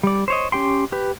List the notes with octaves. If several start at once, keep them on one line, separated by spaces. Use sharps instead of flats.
G3 D5
C5 C#5 D#5
C#4 G4 G5 C6
G4 B4